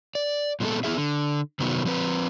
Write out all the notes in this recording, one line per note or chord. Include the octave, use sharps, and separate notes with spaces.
D5
A#2 E3 G#3 B3 A4
B3 C#4 E4 G#4 E5
D3
C3 D#3 F#3 B3
F3 C4 B4